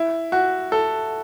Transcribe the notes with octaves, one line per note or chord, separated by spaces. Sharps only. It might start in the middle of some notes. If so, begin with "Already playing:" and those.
Already playing: E4
F#4
A4